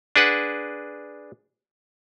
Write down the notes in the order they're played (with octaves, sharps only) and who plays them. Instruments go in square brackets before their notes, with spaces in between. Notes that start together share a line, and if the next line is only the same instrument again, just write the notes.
[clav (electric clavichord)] D4 G#4 B4 F#5